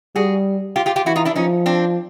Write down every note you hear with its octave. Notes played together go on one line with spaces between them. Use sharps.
G3 F#4 G#4
F4 G4
F4 G4
F4 G4
E3 E4 F#4
D#4 F4
D4 E4
F3 C#4 D#4
C4 D4